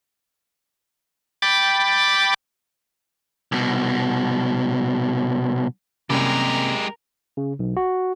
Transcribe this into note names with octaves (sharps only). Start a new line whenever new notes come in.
G5 B5 D6 A6
C2 B2
C2 F#2 C3 G#3 A#3 G4 A#4
C#3
B1
F#4